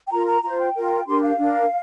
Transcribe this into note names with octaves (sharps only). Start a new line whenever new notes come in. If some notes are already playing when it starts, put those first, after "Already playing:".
G5
F4 A#4 A#5
A#5
F4 C5 A#5
G5
F4 A#4
D4 G4 A#4 C6
F5
D4
A#4